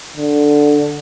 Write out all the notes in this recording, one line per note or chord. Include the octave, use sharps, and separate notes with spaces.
D3